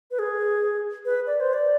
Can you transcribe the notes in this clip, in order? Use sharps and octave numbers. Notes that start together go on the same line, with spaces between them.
B4
G#4
B4
D5
C5
D5